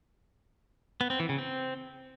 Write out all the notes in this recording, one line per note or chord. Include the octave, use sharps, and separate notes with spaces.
B3
C4
E3
C#3
C4